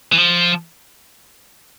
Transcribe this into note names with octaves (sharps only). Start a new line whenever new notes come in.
E3
F3